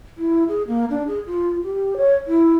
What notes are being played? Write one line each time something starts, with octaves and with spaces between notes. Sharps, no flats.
E4
G#4
A#3
D4
G#4
F4
G4
C#5
E4